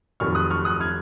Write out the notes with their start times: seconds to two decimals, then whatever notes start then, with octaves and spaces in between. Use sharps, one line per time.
0.20 F1 F2 D#3 F#3 C#6 F6
0.35 D#6 F#6
0.50 C#6 F6
0.65 D#6 F#6
0.80 F6 G#6